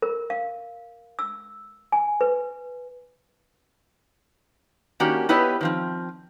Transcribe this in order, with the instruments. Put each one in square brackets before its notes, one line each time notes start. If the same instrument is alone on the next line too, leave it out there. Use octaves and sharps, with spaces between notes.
[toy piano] A#4
F5
E6
G#5
B4
[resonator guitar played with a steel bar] D#3 A#3 C#4 D4 F#4 G4
B3 E4 G4 B4 C#5 D#5
D#3 F3 C4